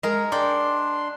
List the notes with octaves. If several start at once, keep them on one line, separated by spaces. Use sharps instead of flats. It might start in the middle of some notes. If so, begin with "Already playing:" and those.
G#3 A#4
D4 D5 G5 C6